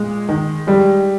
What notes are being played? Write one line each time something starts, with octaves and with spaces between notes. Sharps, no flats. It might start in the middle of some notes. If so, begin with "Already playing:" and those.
Already playing: A#2 G#3
D#3
G3 G#3